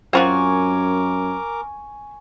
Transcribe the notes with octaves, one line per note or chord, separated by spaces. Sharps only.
F#2 C4 F4 F#4 A#4 G#5 C#6 D6